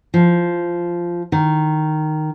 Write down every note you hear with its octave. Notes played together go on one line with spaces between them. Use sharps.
F3
D#3